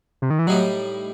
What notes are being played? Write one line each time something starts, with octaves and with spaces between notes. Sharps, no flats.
C3
D#3
E3
A2 F#3 G3 D#4